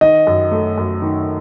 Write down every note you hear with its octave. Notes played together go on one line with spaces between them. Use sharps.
D#3 D#5
F#2
A3
F#2
D#3